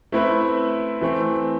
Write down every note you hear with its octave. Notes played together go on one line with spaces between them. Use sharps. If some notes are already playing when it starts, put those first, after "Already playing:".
A3 C4 E4 B4 E5
E3 A3 C4